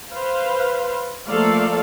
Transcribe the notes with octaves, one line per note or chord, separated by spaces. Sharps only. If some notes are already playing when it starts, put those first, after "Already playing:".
B4 C5 F5
F3 A3 A#3 A4 D5 F5